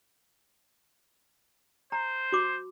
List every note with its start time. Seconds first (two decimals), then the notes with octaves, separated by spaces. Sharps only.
1.92 C5 A#5
2.32 F#4 C6 D6